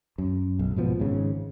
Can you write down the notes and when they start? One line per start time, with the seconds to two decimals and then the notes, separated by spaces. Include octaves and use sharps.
0.18 F#2
0.59 B1
0.76 G#2 B2 F3 B3
0.99 G#1 G#2 C#3